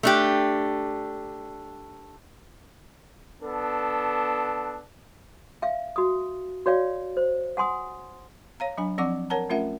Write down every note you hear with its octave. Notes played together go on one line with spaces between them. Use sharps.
A3 D4 G4
B3 D4 A4
E5 F5 G5
F#4 D#6
F#4 C#5 D5 F5 G5
C5
F#5 G#5 C6 D#6
C#5 F5 A#5
F#3 D4 G#5
F3 C4 D5 F#5 C#6 D6
A#4 C#5 F#5 A5 A#5
A3 C#4 F4 A#4 E5 F#5